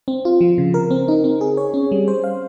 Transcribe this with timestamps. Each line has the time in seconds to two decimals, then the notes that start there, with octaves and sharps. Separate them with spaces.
0.08 C4
0.25 F4
0.41 F3
0.58 C#3
0.74 A#4
0.91 C4
1.08 D#4
1.24 C4
1.41 G#4
1.57 C#5
1.74 C#4
1.92 G3
2.08 C5
2.24 F5